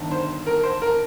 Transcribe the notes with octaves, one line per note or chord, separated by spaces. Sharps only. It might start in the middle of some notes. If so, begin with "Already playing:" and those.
Already playing: G1 G2 D#3
C5
A#4
C5
A#4